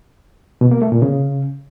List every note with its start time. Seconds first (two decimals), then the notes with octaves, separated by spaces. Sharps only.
0.61 B2
0.71 A#3
0.82 A3
0.92 A#2
1.02 C#3